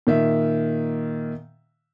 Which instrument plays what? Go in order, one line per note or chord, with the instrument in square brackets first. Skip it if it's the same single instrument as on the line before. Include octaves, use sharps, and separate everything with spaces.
[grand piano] A#2 D#3 E5